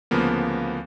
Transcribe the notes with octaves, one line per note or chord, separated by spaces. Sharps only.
D2 C#3 F3 A#3 B3